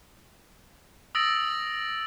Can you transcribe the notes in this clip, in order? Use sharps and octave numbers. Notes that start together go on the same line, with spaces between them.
D#6 E6 A6 A#6 D7 F#7